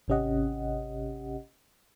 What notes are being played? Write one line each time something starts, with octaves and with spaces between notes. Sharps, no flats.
G#1 C3 C#4 G4 D#5 F#5